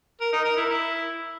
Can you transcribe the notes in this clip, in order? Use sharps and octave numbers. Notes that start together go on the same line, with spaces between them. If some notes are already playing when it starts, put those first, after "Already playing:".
A#4
D#4
A#4
E4
E4